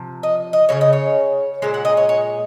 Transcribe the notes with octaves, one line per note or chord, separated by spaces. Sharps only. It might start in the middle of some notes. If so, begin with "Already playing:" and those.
Already playing: C3 F3
D#5
D#5
C#3 G#3 C#5
D#5
C#5
A#2 G#3 C5
F#5
D#5
C#5
C#5